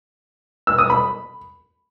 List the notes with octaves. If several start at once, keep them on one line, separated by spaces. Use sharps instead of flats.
E6
D#6
B5